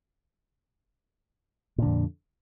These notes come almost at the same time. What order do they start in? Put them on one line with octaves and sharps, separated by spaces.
A#2 D3 F2